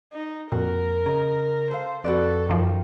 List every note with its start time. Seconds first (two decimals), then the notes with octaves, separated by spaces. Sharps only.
0.13 D#4
0.52 F2 A#2 F#4 A#4
1.06 C#3 D#5 A#5
1.71 A4 C5 F5
2.04 F2 F#4 A4 B4 D5
2.49 F#2 D#3 F3